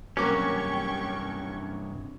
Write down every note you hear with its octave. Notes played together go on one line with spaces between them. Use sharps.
G2 C3 F#3 A#3 C#4 G4 C#6 D6